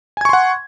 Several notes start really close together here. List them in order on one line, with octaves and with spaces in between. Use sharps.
G#5 G#6 C#6 C6 F#5